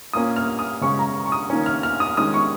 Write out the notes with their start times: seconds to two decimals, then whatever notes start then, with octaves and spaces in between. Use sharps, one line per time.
0.13 A#2 A#3 C#4 D#6
0.36 F6
0.59 D#6
0.81 C#3 G#3 C#4 C#6
0.99 A#5
1.26 C#6
1.32 D#6
1.50 D#3 A#3 C#4
1.66 F6
1.83 F6
2.00 D#6
2.17 D#3 G#3 C#4 D#6
2.34 C#6